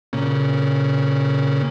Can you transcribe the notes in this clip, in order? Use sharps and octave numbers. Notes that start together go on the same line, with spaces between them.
A#2 C#3